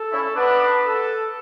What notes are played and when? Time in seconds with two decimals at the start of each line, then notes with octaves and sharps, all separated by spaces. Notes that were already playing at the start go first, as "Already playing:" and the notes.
Already playing: A4
0.12 C#4 E4
0.36 B3 D4 B4
0.85 A4